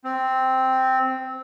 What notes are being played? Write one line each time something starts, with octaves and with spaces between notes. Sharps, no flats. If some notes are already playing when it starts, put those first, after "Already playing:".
C4